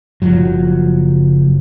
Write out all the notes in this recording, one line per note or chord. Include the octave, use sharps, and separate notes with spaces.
F#1 F3 F#3